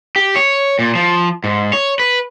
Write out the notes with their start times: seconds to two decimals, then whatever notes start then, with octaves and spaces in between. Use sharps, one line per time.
0.16 G4
0.36 C#5
0.79 A#2
0.95 F3
1.44 G#2
1.73 C#5
2.00 B4